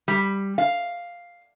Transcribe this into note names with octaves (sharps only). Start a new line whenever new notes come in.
G3
F5